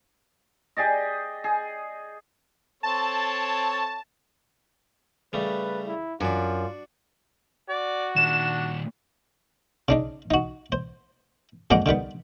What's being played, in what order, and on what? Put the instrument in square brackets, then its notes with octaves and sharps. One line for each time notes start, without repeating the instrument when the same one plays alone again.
[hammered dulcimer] G4 G#4 D5 D#5
G#4
[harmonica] C4 A4 C#5 [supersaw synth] A5
[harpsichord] C#3 G3 A3 [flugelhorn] B4
[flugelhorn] E4
[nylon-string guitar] F#2 [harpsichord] D4 F#4 [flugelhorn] F4
[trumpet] F#4 [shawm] D5
[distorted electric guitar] A#2 D#3 [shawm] D4 [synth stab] E7
[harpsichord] C#3 D4 D#4
D#4 F#4
C5
F2 A#2 G#3 F#5 D6
D3 D#3 G3 B3